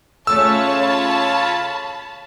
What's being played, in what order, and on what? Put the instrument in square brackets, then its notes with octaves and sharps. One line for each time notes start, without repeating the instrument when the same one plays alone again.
[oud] C#3 A3 C#4 [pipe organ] F4 C#5 [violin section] A5 B5 [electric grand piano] E6